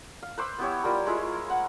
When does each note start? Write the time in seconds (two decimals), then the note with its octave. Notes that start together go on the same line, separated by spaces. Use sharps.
0.23 F5
0.38 B4 C5 D6 E6
0.58 B3 E4 G4 C#5
0.84 G3 F4 A#4 A#5
1.06 G#3 E4 F4
1.50 F#5